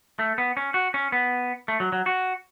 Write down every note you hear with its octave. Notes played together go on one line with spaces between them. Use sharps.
A3
B3
C#4
F#4
C#4
B3
A3
F#3
F#3
F#4